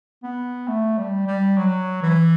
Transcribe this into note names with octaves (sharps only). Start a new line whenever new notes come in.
B3
A3
G3
G3
F#3
E3